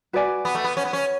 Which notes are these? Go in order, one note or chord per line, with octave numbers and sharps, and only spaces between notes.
F#4 B4 D5 G#5
B3
A3
B3
C#4
B3
C#4